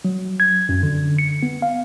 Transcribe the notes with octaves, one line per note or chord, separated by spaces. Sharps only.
F#3
G#6
F#2
D3
C#7
B3
F5